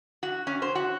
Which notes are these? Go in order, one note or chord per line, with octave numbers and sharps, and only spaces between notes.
F#4
C#4
C5
F#4